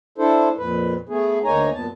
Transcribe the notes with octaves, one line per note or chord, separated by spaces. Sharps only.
D4 E4 A4 C5
F2 A#2 B4
A3 B3 G#4
D2 A#3 D#4 C#5 G#5 A#5
F#2 A#2 B3 A5